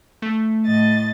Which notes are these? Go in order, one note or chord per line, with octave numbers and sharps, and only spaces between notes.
A3
A2 D#5 A6